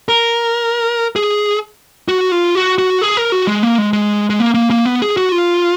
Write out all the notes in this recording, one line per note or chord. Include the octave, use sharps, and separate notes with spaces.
A#4
G#4
F#4
F4
F#4
F#4
G#4
A#4
F#4
G#3
A#3
G#3
G#3
G#3
A#3
A#3
A#3
B3
G#4
F#4
F4